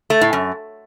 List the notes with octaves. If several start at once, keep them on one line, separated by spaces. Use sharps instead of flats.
A3
A2
F#2